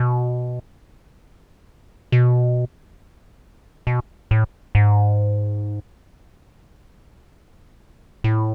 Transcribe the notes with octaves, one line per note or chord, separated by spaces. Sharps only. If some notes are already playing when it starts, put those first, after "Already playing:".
Already playing: B2
B2
B2
A2
G#2
A2